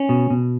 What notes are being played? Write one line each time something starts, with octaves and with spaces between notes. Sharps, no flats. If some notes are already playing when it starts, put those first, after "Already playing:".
Already playing: C#4
B2
B2